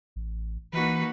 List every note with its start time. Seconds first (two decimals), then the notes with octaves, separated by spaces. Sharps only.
0.16 A1
0.73 E3 A#3 D#4 F#4 B4